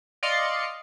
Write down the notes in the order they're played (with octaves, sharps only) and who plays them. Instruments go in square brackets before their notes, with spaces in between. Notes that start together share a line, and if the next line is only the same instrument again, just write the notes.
[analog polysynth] D5 D#5 F5 C6 C#7